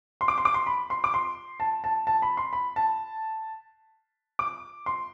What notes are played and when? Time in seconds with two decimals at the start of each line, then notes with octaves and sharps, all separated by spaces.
0.21 C6
0.28 D6
0.38 C6
0.45 D6
0.54 C6
0.67 B5
0.90 C6
1.04 D6
1.14 C6
1.60 A5
1.84 A5
2.07 A5
2.22 B5
2.37 C6
2.53 B5
2.76 A5
4.39 D6
4.86 C6